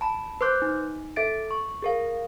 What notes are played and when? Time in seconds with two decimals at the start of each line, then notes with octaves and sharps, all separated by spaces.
0.01 A5 B5
0.41 B4 C5 C6 D6 F#6 G6
0.62 D#4
1.16 A4 E5 A6 D7
1.51 C#6
1.82 G#4 A#4 F5